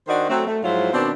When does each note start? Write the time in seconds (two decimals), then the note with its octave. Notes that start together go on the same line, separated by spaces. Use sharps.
0.08 D#3 D4 F#4 C5 D5 D#5
0.29 F#3 A3 C4
0.47 A3
0.63 G#2 F3 F#3 E4 F4 C5
0.94 B2 D#3 C4 D4